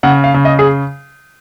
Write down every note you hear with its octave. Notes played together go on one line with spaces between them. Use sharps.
C#3 F#5
F5
C#3
D#5
G#4